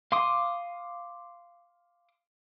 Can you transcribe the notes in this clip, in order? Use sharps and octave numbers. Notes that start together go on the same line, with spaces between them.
F5 C6 D6 D#6